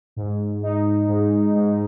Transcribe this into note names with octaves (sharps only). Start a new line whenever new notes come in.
G#2
D#4
G#2
G#2